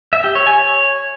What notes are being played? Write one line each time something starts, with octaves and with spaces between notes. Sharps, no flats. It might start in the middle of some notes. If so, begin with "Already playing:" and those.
E5
G4
C#5
G#5
C#5